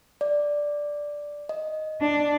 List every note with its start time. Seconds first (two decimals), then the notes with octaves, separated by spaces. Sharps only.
0.21 D5
1.49 D#5
2.01 D4